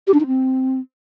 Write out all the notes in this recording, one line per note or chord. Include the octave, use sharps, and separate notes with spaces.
G4
D4
D#4
C4